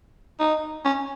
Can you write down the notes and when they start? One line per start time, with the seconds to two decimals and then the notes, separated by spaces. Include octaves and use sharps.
0.40 D#4
0.85 C#4